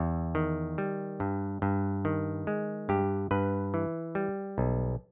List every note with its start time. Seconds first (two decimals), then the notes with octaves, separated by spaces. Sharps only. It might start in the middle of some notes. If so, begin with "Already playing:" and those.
Already playing: E2
0.35 D#3
0.78 G3
1.20 G2
1.62 G2
2.05 D#3
2.47 G#3
2.89 G2 G4
3.31 G2 B4
3.74 E3
4.15 G3
4.58 B1